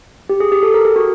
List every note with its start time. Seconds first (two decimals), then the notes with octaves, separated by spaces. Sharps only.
0.29 G4
0.40 G#4
0.52 G4
0.63 A4
0.74 A#4
0.85 G#4
0.96 F#4